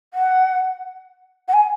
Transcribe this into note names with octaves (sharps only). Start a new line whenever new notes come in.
F#5
F#5
G#5